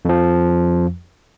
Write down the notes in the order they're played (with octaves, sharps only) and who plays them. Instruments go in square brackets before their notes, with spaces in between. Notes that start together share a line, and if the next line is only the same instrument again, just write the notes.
[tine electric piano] F2 F3